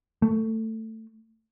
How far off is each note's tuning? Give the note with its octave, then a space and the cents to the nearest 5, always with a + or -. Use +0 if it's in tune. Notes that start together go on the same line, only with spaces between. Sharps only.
A3 +15